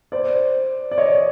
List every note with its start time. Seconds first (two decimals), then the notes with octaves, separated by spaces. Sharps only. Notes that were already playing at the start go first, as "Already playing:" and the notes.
0.12 C5 D5
0.91 D5
0.98 C#5 D#5